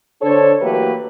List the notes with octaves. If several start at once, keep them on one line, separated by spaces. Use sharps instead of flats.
D3 D4 A4 C5 C#5
E3 F#3 A3 A#3 G4 B4